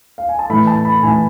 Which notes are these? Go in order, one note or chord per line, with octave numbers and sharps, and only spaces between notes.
F5
G#5
A5
A2 E3 A3 B5
A5
B5
A2 E3 A3 G#5